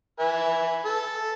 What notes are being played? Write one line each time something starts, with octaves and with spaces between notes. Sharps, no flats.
B4 E5 G#5
A4